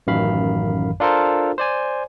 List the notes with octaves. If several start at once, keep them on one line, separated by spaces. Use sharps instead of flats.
A1 F#2 D#3 F5 B5
D4 F4 A4 A#4 C5
C5 D5 G#5